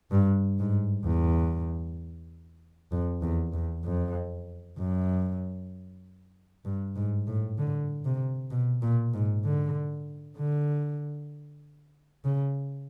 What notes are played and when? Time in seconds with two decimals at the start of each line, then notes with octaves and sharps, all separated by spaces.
0.11 G2
0.59 G#2
1.05 E2
2.92 F2
3.22 E2
3.53 E2
3.84 F2
4.78 F#2
6.65 G2
6.96 G#2
7.27 A2
7.58 D3
8.05 C3
8.51 B2
8.82 A#2
9.14 G#2
9.44 D3
10.37 D3
12.25 C#3